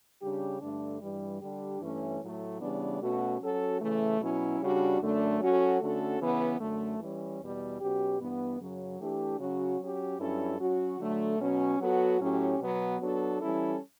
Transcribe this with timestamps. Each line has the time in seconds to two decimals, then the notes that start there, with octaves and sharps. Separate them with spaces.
0.21 C#3 G3 D4 G4
0.61 G2 D3 A3 D4
1.01 G2 E3 G3
1.42 D3 G3 D4 G4
1.81 G2 E3 A3 C#4
2.21 A2 F#3 A3
2.61 C#3 E3 G3 B3 D4
3.01 B2 A3 C#4 F#4
3.41 F#3 C#4 F#4 A4
3.81 C#3 E3 A3
4.21 B2 F#3 C#4 E4
4.61 C#3 G3 D4 F#4
5.01 F#2 D3 A3 D4
5.40 F#3 C#4 F#4 A4
5.81 D3 A3 C#4 F#4 A4
6.20 C#3 E3 B3
6.60 F#2 D3 A3
7.00 E3 G3 C#4
7.40 E2 B2 G3
7.80 B2 F#3 C#4 G4
8.20 G2 E3 B3
8.60 F#2 C#3 F#3
9.00 E3 A3 D4 G4
9.40 C#3 F#3 C#4 F#4
9.80 F#3 C#4 G4
10.20 G2 F#3 C#4 E4 A4
10.60 F#3 C#4 F#4
11.00 D3 F#3 A3
11.40 B2 F#3 C#4
11.79 F#3 B3 F#4 A4
12.19 A2 F#3 C#4 G4
12.59 B2 F#3 B3
13.00 F#3 B3 D4 F#4 A4
13.40 E3 G3 C#4 E4 A4